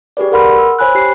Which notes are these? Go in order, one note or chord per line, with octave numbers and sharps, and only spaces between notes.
G4 G#4 B4 D5
A#4 B4 F#5 B5 C6 F6
E6
C5 C#5 G#5 B5 F#6
G4 C7